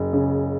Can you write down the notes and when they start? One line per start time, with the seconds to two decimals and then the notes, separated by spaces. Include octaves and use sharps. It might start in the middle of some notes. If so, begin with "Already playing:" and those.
Already playing: F#1
0.13 C#3